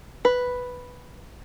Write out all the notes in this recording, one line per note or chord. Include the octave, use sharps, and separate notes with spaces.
B4